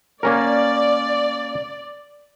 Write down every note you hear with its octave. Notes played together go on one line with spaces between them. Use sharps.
A#3 C#4 A#4 D5